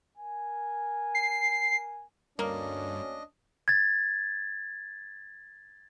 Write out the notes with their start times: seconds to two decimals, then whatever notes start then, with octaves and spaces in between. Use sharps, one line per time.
0.18 A#4 G#5
1.15 C7
2.39 D2 G2 A#3 C#4 D4 D#5
3.68 G#6 A6